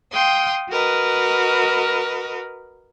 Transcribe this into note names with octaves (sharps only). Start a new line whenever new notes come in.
F5 G5 C6 D#6
F#4 A#4 B4 D#5